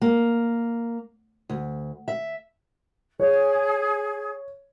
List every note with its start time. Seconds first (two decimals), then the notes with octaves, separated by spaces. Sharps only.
0.02 A#3
1.49 D2
2.08 E5
3.20 G#4 C#5